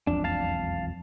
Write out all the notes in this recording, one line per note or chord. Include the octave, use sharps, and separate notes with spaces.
E1 B1 F2 D4
F5 A5